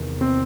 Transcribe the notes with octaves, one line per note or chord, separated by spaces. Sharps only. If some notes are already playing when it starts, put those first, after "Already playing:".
Already playing: E2 C3 D#3
C4